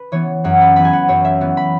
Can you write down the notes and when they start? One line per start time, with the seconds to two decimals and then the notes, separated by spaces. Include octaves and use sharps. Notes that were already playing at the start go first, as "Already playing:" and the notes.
Already playing: B4
0.12 E3 B3 C#5
0.44 F#2 F#5
0.61 B5
0.76 E3 B3 B5
0.85 G#5
0.93 F#5
1.08 F#2 C#5
1.25 E5
1.41 E3 B3
1.57 B5